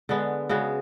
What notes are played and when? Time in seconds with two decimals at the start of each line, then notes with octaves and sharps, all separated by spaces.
0.09 D3 G#3 B3
0.49 C#3 G#3 B3 F#4